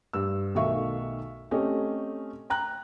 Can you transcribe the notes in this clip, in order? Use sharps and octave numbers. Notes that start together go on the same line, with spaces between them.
G2 E6
B1 D#3 A3 E5 F5 C#6
A3 C4 C#4 G4 D#5
G5 A#5 F#6